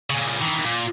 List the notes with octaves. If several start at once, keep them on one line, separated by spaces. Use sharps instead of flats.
A#2 C#3
D#3 E3
A#2